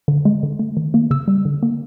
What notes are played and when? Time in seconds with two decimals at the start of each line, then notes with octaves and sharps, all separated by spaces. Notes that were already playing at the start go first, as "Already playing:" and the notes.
0.08 D3
0.25 G#3
0.43 D3
0.59 A3
0.77 D#3
0.94 A#3
1.11 C#3 E6
1.28 G3
1.45 D3
1.63 A#3